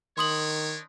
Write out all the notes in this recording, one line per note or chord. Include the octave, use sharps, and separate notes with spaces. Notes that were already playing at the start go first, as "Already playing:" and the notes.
D#3 D4 D#4 C#5 C6 D#6 F#7